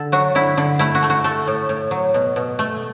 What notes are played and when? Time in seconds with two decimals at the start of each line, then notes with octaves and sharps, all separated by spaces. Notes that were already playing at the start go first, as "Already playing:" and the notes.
Already playing: D3 A4
0.12 F#3 F#4
0.35 D3 E4
0.57 D3
0.79 A3 E4
0.95 F#4
1.03 A3
1.10 F#4
1.24 A3 A4
1.47 A2
1.69 A2
1.91 F#3
2.14 B2
2.36 B2
2.59 A3